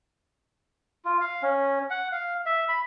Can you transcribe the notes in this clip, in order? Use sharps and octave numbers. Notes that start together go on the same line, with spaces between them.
F4
F5
C#4
F#5
F5
E5
B5